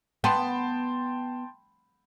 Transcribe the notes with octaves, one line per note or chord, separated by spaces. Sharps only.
B3 G5 A5 C6